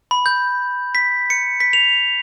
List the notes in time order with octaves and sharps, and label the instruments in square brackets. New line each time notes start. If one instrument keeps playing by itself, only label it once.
[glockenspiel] B5
G6
B6
C#7
B6
F7